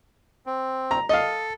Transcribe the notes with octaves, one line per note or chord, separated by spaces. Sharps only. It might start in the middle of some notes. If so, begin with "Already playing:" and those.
C4
A#5
A4 D#5 F5